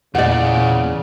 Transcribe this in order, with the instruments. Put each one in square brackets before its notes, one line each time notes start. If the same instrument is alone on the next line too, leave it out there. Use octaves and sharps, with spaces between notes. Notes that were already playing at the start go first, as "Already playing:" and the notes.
[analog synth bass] E2 [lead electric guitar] A#2 [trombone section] C#3 [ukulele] D5 F#5